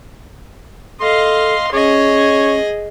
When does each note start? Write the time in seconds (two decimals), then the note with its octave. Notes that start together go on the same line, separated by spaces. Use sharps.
1.01 A4 D#5 F5 C6
1.73 C#4 G#4 C#5 D#5